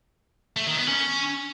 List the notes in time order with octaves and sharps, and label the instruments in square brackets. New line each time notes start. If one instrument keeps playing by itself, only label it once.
[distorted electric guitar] A3
D#3
B3
C#4